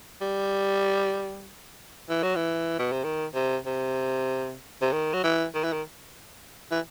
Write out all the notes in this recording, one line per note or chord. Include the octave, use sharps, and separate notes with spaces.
G3
E3
F#3
E3
B2
C3
D#3
C3
C3
C3
D#3
F#3
E3
D#3
E3
D#3
E3